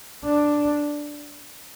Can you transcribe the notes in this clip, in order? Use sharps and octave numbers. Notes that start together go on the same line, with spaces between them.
D4